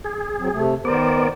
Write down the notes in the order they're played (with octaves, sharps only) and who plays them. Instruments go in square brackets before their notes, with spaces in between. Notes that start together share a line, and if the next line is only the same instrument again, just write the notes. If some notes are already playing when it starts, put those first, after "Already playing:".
[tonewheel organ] G#4
[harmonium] F#3 C4
C3 A3
[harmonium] D#3 A#4 C5 [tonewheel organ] B3 D5